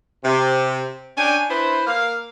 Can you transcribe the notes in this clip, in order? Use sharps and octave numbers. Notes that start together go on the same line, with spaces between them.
C3
C#4 D4 G5 G#5
D4 E4 B4 C5
A#3 F5